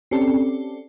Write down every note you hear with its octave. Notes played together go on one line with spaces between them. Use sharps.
C4 C#4 G4 A4 D5